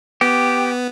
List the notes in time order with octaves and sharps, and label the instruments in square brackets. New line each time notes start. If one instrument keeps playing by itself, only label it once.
[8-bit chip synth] B3 [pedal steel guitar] G4